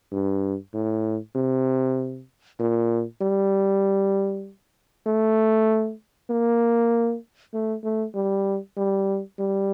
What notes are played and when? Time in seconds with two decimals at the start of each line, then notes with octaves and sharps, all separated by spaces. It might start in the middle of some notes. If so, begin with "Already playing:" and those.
0.12 G2
0.74 A2
1.36 C3
2.60 A#2
3.21 G3
5.07 A3
6.30 A#3
7.54 A3
7.84 A3
8.15 G3
8.77 G3
9.39 G3